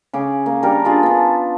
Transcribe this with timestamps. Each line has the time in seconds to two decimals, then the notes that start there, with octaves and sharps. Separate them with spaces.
0.13 C#3 G#4 D6
0.46 A#3
0.63 G3 D4 A#4
0.85 D4 F4 G#4
1.03 B3 A5